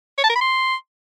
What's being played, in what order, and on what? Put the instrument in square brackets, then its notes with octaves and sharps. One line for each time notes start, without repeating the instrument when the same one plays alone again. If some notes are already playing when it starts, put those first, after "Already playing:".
[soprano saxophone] C#5
A5
A#4
B5
C6